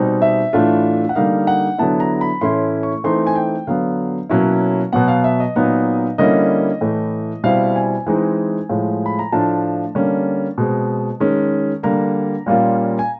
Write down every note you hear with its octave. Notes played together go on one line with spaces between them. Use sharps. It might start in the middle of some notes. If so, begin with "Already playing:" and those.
Already playing: B2 G3 C4 D#4
E5
A2 E3 A3 D4 F4
F#5
D3 G3 A#3 D#4 F5
F#5
D3 F#3 B3 E4 A5
A#5
B5
A2 E3 A3 C#4 E4 C6
C#6
E3 A3 C4 D#4 C6
G#5
G5
D3 F#3 B3 F5
B2 F#3 A#3 C#4 E4
B2 F#3 B3 F#5
F5
E5
D#5
A#2 F#3 B3 D#4
D3 G3 A#3 C#4 E4 D#5
A2 E3 A3
B2 G3 C4 E4 F5
G#5
E3 G#3 C4 D#4
A2 F3 G#3
B5
A#5
A2 F3 A3 D4 F4 A5
D3 G3 A#3 C#4
B2 G#3 C4
D#3 G#3 C#4
D3 G3 A#3 A#5
A#2 G3 A#3 C#4 F4
G#5